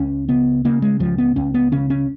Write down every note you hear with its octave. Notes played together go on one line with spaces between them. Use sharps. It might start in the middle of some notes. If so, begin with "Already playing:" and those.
Already playing: C#2 C#4
C#3 B3
C#3 A#3
G#3
C#2 F3
B3
C#2 C#4
B3
C#3 C#4
C#4